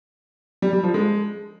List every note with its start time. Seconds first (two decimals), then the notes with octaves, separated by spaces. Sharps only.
0.62 G3
0.73 G3
0.84 F3
0.94 G#3